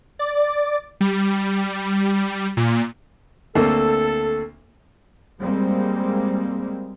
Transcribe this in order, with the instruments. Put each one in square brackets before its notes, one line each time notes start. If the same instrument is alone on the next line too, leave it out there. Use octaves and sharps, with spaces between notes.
[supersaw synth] D5
G3
A#2
[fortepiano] D2 A#3 C4 [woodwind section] A4
[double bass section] G3 G#3 A#3 C4